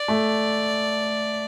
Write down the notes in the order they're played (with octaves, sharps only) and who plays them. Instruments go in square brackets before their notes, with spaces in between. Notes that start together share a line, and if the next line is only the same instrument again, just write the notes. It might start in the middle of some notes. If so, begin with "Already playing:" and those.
Already playing: [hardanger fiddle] D5
[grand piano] A3